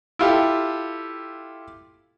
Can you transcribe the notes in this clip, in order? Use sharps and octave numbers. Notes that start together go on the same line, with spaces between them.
E4 F4 G4 A4